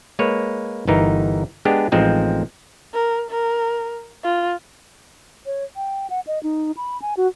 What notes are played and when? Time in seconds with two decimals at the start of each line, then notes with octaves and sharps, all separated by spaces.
0.19 G#3 A#3 B4 C#5
0.87 G1 E3 D#4 A#4
1.65 G#3 B3 D4 G4 G#4
1.92 A1 F3 G#3 C4 D#4
2.94 A#4
3.31 A#4
4.24 F4
5.46 C#5
5.76 G5
6.10 F#5
6.27 D#5
6.43 D#4
6.77 B5
7.02 G#5
7.17 F#4